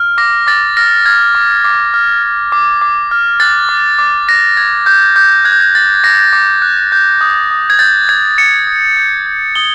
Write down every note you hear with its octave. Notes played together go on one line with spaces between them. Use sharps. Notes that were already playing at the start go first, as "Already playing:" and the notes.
Already playing: F6
D6 A#6
D6 A6
F6 A#6
F6 G#6
D6
D6
F6
F6
D6
D6
F6
F#6 A6
D6
D6
F#6 A#6
F#6 G#6
D6 G6
D6 G6
F#6 G#6
G6
G#6
F#6 A6
D6 A#6
D6
F#6
G6
D#6
D#6
G#6
G6 A6
G6 G#6
D#6 C#7
D#6
G6
G6
D#6 G7